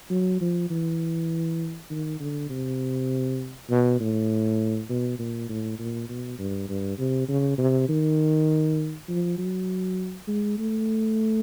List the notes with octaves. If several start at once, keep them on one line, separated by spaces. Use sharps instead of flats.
F#3
F3
E3
D#3
D3
C3
B2
A2
B2
A#2
A2
A#2
B2
G2
G2
C3
C#3
C3
D#3
F3
F#3
G#3
A3